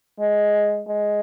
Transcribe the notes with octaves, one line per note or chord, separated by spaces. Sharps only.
G#3
G#3